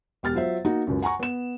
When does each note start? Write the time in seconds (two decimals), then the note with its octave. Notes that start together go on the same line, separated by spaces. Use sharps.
0.23 E1 G4 F6 A6
0.34 F#3 F4 C5 E5
0.65 A#3 D#4 F#4
0.87 C#2 F#2
1.02 F#5 G#5 A#5 C#6
1.20 B3 E7